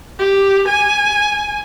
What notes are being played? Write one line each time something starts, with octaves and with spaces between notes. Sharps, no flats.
G4
G#5